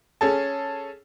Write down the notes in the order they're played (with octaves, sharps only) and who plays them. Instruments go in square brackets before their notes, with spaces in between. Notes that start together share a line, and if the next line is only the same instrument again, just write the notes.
[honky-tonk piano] C#4 G#4 A4